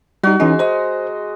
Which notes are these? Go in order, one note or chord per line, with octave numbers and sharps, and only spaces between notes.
G3 D#4 F#4
E3 G#3 C#4 D#4
C5 D#5 A#5